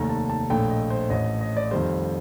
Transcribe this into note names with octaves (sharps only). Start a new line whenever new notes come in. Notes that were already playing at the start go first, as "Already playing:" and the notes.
Already playing: F1 D#2 D#3 A3 A#5
A5
A5
A#1 A2 A3 G5
D#5
C5
A1 A2 A3 D#5
D#5
D5
F2 D#3 G3 C5